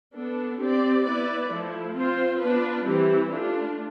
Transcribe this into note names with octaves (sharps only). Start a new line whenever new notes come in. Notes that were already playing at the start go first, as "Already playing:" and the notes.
B3 D4 A4
C4 G4 D5
B3 E4 B4 D5
F3 A3 E4
C4 F4 C5
B3 D4 F4 B4
E3 G3 C4 E4 G4
A3 D4 F4